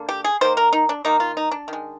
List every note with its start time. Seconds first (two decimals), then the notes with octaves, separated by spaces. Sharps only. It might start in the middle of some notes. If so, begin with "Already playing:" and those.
Already playing: D3 A#3
0.09 G4
0.24 G#4
0.41 D#3 A#3 C5
0.57 A#4
0.73 D#4
0.89 D4
1.05 D#3 A#3 D#4
1.20 F4
1.37 D#4
1.51 D4
1.68 D#3 G#3